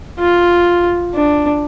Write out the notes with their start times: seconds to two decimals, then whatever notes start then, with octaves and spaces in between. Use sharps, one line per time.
0.19 F4
1.15 D4